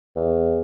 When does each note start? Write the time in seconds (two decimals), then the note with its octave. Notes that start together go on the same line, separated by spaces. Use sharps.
0.16 E2